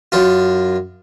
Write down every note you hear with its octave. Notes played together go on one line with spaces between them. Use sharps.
F#2 F4